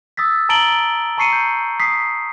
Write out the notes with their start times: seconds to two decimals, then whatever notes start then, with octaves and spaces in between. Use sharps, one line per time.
0.17 D#6 E6 A6 B6
0.49 A5 A#5 A6 D7 F#7 G7
1.18 A5 A#5 C#6 C7 C#7 D#7
1.33 G6
1.80 D#6 B6 C7